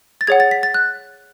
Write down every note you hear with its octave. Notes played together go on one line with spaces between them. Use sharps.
A6
G#4 C#5 F#5 G#6
A6
B6
A6
F#6